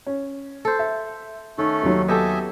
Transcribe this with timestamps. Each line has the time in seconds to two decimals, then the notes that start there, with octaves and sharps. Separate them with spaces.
0.07 C#4
0.65 A4 C5
0.79 E5
1.58 D#3 A3 C#4 A4
1.83 D#2 D#3 F#3
2.08 B3 G4 A4 D#5 E5 G#5